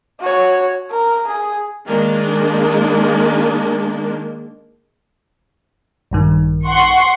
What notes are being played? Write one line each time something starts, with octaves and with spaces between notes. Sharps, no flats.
F#4 C#5
A#4
G#4
D#3 G#3 A#3 D4
A#1 G2 D#3
F#5 C6 C#6